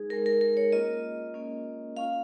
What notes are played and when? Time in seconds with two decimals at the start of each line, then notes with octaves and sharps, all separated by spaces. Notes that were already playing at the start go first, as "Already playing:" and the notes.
Already playing: G#3 D#4 G#4
0.10 G#3 D#4 A#4
0.26 A#4
0.41 A#4
0.57 C#5
0.72 A#3 C#4 F4 D#5
1.34 A#3 C#4 F4
1.96 A#3 C#4 F4 F5